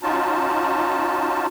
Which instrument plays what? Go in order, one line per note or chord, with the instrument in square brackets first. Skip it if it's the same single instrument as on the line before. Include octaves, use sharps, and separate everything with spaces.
[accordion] C#4 D#4 F4 F#4 A5